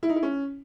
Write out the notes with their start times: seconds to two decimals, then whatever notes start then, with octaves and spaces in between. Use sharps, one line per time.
0.03 E4
0.09 D#4
0.16 E4
0.23 C#4